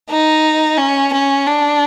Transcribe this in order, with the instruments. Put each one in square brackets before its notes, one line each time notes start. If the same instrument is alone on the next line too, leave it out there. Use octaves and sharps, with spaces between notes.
[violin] D#4
C#4
C#4
D4